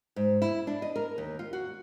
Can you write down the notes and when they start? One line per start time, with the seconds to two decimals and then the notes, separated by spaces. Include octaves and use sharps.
0.16 G#2
0.42 E4
0.67 D4
0.82 D#5
0.96 A#4
1.18 D#2
1.39 F4
1.53 F#4